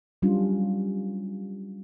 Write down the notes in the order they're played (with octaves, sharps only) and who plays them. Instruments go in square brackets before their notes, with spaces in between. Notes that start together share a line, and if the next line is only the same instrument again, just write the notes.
[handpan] F#3 G3 C#4 D4 F4